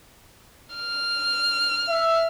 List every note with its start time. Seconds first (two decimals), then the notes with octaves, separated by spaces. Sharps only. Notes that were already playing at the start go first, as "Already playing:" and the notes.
0.76 F6
1.90 E5